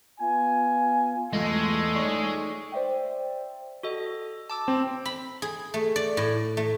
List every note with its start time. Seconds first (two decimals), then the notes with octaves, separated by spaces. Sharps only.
0.20 B3 F4 G#5
1.33 E2 G#3 A3 F4 D#5
1.95 D#4 C#5 D5
2.72 C5 D5 E5 G5
3.83 F#4 A4 D#5
4.50 A5 D6 E6
4.68 C4
5.05 B5
5.42 G#4
5.74 A3
5.96 D5
6.17 A2
6.57 A3